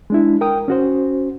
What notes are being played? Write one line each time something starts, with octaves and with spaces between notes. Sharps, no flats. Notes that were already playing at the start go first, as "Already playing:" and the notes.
G#3 D4 E4
A#4 G5 D#6
C#4 F#4 C5